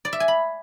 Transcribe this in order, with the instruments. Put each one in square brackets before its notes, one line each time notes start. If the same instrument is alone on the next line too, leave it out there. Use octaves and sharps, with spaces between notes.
[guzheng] D5
E5
G#5
B5